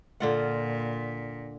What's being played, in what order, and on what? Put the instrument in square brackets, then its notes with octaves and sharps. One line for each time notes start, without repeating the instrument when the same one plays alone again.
[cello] A#2 [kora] D3 F4 F#5